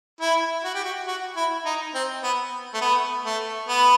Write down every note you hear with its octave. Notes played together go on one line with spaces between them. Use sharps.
E4
F#4
G4
F#4
F#4
E4
D#4
C4
B3
A3
B3
A3
B3